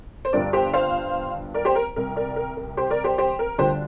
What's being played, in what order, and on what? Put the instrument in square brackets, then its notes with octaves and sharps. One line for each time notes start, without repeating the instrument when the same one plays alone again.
[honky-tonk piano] C5
G1 G2 G3 D4 F4 A#4 D5
G4 C5
C5 F5
A#4 D5
G4 C5
A#4
C2 C3 G3 A#4
A#4 D5
A#4
A#4
G4 C5
A#4 D5
G4 C5
G4 C5
A#4
D2 D3 G3 D4 F4 G4 C5